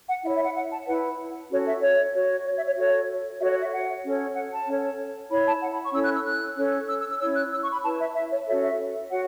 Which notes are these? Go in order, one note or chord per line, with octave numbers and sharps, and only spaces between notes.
F#5
E4 C#5 E5
E5
F#5
F#5
A5
E4 B4 F#5
C#4 F#4 A4 C#5
E5
C#5
F#4 C#5
C#5
E5
C#5
F#4 A4 C#5
F#4 A4 C#5 E5
C#5
E5
F#5
C#4 A4 C#5
F#5
A5
C#4 A4 C#5
E4 C#5 B5
A5
F#5
B5
C#6
C#4 E4 A4 C#5 E6
F#6
E6
F#6
C#4 A4 C#5
E6
E6
E6
C#4 E4 C#5 E6
F#6
E6
C#6
B5
E4 B4 A5
E5
E5
C#5
C#4 F#4 A4 C#5 E5
E5
F#4 C#5 F#5